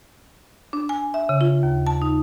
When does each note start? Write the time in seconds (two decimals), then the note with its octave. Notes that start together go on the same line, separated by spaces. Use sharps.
0.73 D4
0.89 G#5
1.14 E5
1.29 C#3
1.41 F4
1.63 D#2
1.87 A5
2.02 D#4